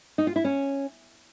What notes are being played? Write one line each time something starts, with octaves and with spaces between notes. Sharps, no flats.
D#4
F4
E4
C#4